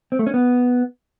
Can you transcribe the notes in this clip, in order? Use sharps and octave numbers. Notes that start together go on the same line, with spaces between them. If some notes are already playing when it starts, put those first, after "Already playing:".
C4
A3
C#4
B3